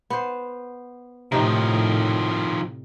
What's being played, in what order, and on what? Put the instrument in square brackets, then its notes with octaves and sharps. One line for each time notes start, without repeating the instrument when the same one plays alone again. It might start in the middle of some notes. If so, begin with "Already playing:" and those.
[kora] B3 C5
[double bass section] A2 [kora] C3 D#4 [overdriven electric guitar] D#3 F3